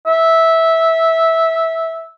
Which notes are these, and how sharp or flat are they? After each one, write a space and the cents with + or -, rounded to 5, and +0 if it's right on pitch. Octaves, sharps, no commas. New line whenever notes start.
E5 -10